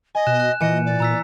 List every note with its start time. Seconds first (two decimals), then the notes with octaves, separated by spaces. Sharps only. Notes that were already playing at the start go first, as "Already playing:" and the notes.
0.15 D#5 G#5
0.27 B2 F#6 E7
0.40 F#6
0.61 A#2 E3 D#5 G#5 C#7
0.85 D5
1.00 A#2 A#5 E6 B6